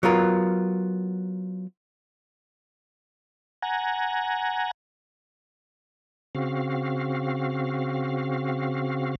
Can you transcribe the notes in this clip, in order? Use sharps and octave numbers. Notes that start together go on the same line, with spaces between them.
F#3 B3 F4 A#4
F#5 G#5 A#5
C#3 C4 F#4 F5